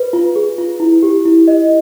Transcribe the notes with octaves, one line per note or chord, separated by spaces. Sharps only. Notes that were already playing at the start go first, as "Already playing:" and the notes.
Already playing: B4
F4
G#4
F4
E4
G4
E4
D#5